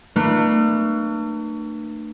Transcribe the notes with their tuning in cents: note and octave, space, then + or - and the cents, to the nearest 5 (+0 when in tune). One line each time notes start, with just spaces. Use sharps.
A3 +40 D4 +45 B4 -35